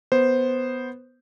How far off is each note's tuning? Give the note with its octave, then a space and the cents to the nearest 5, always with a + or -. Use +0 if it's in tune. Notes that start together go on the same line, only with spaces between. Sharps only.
B3 +0 C5 +0